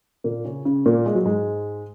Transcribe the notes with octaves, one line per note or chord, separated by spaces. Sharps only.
A#2 A#3
C#3 C#4
C#3 C#4
A#2 A#3
G#3
F#3
G#2 G#3